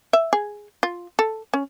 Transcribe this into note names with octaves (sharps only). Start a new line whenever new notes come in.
E5
G#4
F4
A4
C#4